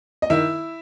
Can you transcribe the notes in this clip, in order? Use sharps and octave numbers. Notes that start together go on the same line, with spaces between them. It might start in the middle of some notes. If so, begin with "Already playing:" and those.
D#5
D#3 E4 E5